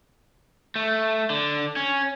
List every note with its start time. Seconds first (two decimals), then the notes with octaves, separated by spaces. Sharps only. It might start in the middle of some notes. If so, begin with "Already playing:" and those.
0.76 A3
1.30 D3
1.76 C#4